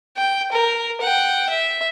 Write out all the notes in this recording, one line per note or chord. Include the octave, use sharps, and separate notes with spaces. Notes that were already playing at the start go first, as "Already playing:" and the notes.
G5
A#4
F#5 G5
E5